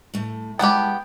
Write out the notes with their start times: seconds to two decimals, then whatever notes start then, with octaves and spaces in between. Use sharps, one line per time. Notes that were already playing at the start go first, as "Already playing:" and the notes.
0.14 A2 A3
0.59 G#3 B3 E4 G4 G5 A5